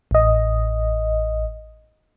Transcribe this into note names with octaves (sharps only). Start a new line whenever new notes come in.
A1 D#5